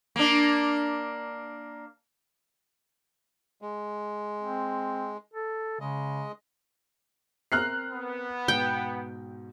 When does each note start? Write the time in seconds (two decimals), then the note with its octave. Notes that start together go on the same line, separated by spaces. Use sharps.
0.16 A#3 D4
3.62 G#3
4.43 C4
5.33 A4
5.80 C#3 G#3 D#5
7.52 C4 A#4 A#5 F6 F#6 C7
7.92 B3
8.48 G#2 B2 G5 G6